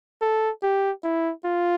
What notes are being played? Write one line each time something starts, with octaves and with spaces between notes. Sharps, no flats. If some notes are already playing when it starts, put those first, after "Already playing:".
A4
G4
E4
F4